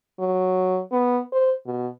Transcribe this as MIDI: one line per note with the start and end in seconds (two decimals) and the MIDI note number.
0.19 0.80 54
0.92 1.20 59
1.32 1.53 72
1.66 1.87 47